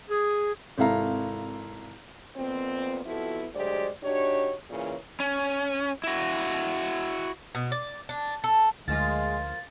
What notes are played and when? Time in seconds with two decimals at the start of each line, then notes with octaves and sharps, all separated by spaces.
0.09 G#4
0.78 G#1 C3 E4 A4 F5 A#5
2.36 F2 A#2 B3 C4
3.05 F2 F3 B3 E4 F#4 A4
3.54 D2 F#3 G#3 G4 C5 D5
4.03 D4 D#4 F#4 G4 C#5
4.70 A#2 C#3 E3 A#3 A#4 C#5
5.20 C#4
6.04 E4 F#4
7.55 B2
7.72 D5
8.09 D4
8.44 A4
8.88 D2 F3 G#3 A#3 F4 A6